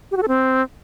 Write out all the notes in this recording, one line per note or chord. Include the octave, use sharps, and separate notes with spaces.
G4
F#4
A4
C4